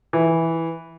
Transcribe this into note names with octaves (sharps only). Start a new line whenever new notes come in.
E3